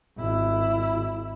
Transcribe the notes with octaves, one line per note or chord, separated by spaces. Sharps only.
G#1 E4